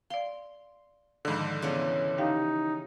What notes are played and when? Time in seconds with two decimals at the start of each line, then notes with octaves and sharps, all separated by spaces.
0.10 D5 F5 C6
1.25 G#2 D3 D#3 F3 B5
1.62 C#3 E3 B3 C#5 D5
2.18 D#4 G4 F5 G5